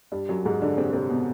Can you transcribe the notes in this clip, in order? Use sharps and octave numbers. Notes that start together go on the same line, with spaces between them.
G2 G3
F#2 F#3
G#2 G#3
D3 D4
C3 C4
C3 C4
B2 B3